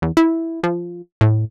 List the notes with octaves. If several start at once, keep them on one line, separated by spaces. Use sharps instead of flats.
E2
E4
F3
A2